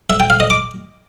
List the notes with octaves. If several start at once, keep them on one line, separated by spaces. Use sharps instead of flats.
E5
G5
F5
D#5
D6